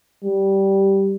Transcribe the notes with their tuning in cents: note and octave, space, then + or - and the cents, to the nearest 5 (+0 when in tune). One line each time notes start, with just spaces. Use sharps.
G3 -10